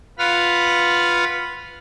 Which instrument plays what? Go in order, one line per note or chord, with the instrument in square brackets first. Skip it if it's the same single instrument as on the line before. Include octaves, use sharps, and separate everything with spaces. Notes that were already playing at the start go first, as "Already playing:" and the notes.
[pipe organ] F4 B4 F#5 B5 F6